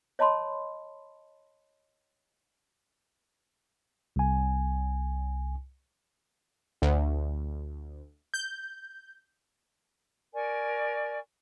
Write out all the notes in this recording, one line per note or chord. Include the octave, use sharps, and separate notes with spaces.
C#5 D#5 A5 B5 C6
C2 G#5
D2
G6
A#4 D5 G#5 C#6